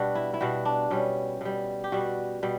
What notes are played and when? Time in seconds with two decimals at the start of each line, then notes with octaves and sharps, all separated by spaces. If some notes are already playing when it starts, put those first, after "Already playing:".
Already playing: B2 G3 D4 F#4
0.15 E4
0.34 E4
0.41 B2 G3 F#4
0.65 D4
0.91 B2 G3 C#4
1.41 B2 G3
1.84 G4
1.92 B2 G3 F#4
2.43 B2 G3